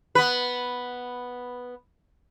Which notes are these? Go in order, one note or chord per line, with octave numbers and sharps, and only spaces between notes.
B3 B4